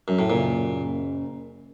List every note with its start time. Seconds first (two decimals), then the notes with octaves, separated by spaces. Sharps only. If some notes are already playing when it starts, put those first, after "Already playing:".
0.08 F#2
0.19 A2
0.30 F#1 F#2 A#2 C#3